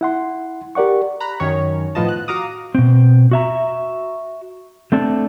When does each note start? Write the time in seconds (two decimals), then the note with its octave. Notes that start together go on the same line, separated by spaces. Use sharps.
0.01 E4 F#5 C6
0.75 G4 A#4 D5 F#5 C#6
1.20 A#5 B5 F#6
1.40 F#2 D#3 C#4 C#5
1.95 A2 F3 B3 F4 D#5 A5
2.08 F#6
2.28 F#4 F5 A#5 D6 D#6
2.75 B2 C4
3.31 F#4 E5 A#5
4.92 A3 C4 D4 A4